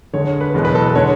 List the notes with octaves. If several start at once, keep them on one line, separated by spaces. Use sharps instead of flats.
D2 D3 G#3 C#5
B4
F#1 E2 B2 G#3
B4
A4
D3 G#3 C#5